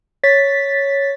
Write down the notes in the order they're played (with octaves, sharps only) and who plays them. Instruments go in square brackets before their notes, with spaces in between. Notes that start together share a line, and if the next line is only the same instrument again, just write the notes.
[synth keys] C#5 A6 B6